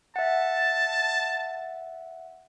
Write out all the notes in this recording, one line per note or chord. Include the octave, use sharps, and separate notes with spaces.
E5 F#5 A5